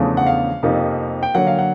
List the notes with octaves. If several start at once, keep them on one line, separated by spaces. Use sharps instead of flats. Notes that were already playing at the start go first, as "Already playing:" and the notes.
Already playing: E2 C#3 F3 A3 D4
F#5
F5
F2 C3 F3 A#3 D#4
G5
D3 F#3 A#3 F#5
F5
F#5